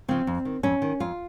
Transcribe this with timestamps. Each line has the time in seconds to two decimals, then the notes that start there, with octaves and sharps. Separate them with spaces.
0.08 C#3 F3 C4
0.27 F2
0.45 D#3
0.63 F2 C#4
0.82 D#3
1.00 F2 F4